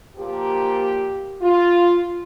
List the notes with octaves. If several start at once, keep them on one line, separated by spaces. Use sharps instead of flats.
A#2 F3 A#3 G4
F4